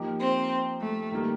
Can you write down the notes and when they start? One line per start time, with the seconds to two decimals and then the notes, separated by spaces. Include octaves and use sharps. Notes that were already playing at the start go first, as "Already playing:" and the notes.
Already playing: F3 A#3 D#4 G4
0.20 C4
0.80 A3
1.12 D#3 G3 A#3